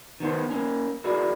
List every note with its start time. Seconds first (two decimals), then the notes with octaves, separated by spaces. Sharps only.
0.20 D#3 B3 C5
0.50 A#3 C#4
1.04 E4 F#4 G#4 A#4 D5